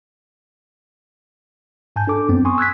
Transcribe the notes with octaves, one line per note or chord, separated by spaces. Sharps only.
G#2 G#5 A5 G6
D4 A4 D6
F#2 B3 C4
G#5 C6 C#6 D#6
E6 F#6 G#6 B6